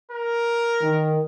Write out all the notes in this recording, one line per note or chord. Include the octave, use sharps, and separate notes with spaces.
A#4
D#3